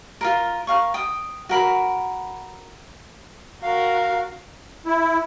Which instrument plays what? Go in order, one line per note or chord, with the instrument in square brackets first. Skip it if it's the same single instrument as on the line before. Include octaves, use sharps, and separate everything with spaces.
[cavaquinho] F4 G#4 A#4
A#4 F5 C#6
G5 D#6
F#4 A#4 B5
[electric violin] F#4 A#4 [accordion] F5
[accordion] E4